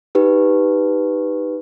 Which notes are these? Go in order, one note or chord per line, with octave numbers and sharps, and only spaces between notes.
D#4 G4 B4